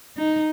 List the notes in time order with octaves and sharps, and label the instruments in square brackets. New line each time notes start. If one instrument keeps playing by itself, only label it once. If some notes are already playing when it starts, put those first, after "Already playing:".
[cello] D#4